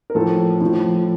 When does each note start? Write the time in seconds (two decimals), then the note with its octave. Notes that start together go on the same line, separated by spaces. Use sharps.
0.10 A#4
0.15 A2 F3 A4
0.61 A2 F3